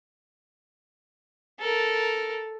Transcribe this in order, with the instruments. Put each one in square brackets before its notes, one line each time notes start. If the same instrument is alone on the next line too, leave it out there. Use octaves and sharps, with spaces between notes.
[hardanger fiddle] A4 A#4